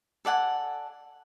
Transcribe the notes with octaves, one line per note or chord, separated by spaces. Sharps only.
A4 D5 F#5 G#5